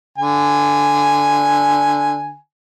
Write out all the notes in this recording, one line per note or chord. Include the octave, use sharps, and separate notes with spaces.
D3 G#5